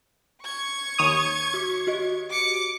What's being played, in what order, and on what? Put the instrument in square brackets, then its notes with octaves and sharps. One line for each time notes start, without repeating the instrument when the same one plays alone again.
[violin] C#6 G#6
[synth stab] D#2 C#5 D#6
[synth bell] F#4 D6
F#4 G4 D#5
[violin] D6 C#7